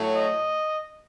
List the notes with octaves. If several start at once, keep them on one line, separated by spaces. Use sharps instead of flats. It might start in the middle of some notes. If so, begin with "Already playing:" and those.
Already playing: A2 F#3 A3
D#5